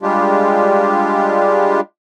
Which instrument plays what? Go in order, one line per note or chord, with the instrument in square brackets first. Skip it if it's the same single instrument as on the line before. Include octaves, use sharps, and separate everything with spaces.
[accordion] G3 G#3 D4 F4 G4